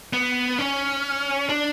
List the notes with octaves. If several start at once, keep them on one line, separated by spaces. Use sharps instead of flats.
B3
C#4
D4